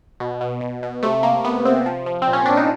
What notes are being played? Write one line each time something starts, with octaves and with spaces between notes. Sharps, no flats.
B2
B2
B2
B2
C3 A3
C3 A#3
C3 B3
C3 C4
F3
F3
C4
A#2
C#4
A#2 D4
D#4